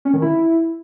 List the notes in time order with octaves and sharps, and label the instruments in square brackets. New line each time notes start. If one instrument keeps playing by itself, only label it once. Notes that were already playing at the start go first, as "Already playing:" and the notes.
[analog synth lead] C#4
D#3
E4